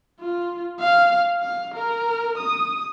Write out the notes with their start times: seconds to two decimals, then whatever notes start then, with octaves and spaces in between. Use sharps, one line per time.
0.20 F4
0.80 F5
1.41 F5
1.74 A#4
2.38 D#6